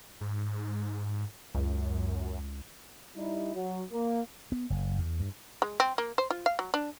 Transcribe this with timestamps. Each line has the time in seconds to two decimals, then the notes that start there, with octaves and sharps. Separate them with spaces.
0.21 G#2
1.55 C#2 F#2
3.16 G3 D#4 E4
3.54 F#3
3.91 A#3
4.52 B3
4.70 F#1
4.98 E2
5.20 G2
5.62 G#3
5.80 C4
5.98 A#3
6.18 C5
6.30 F4
6.46 F5
6.59 F#3
6.74 D4